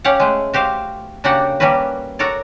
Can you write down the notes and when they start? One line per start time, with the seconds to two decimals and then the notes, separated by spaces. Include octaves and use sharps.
0.04 C#4 G4 F5 F#5
0.20 G#3 A3
0.53 F#4 G4 C5 F5
1.24 C#3 A#3 D4 F#4 G4 F#5
1.60 G3 A#3 C#4 F#4 B4
2.19 F#4 A4 A#4 C#5 D5